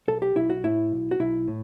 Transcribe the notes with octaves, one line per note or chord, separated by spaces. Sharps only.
B1 A4
G4
B1 E4
F#4
A2 E4
B1
F#4
B1 E4
A2